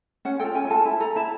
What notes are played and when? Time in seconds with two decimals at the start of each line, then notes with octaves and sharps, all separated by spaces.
0.25 C#4 F#5
0.40 F4 A4 G5
0.55 C#4 G#5
0.65 G#5
0.70 F4 A4 A5
0.85 E4
1.00 A4 A#5
1.16 E4 A5